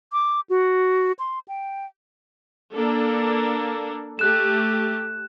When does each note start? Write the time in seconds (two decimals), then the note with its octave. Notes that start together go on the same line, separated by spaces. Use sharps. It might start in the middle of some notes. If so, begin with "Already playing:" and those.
0.13 D6
0.50 F#4
1.19 C6
1.48 G5
2.74 A#3 D4 A4
4.19 A3 G4 F#6 E7